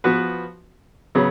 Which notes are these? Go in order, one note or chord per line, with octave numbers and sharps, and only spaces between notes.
F3 B3 F#4 B4
C#3 F#3 B3